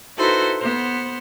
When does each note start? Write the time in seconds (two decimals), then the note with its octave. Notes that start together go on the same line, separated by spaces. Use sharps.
0.17 D#4 E4 F#4 A4 B4 C5
0.58 B3 C5